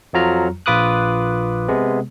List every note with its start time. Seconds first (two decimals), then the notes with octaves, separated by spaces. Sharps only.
0.13 F2 F3 F#3 F4 A#5 F6
0.66 A#1 F4 B4 D6 D#6 F#6
1.68 C3 G#3 B3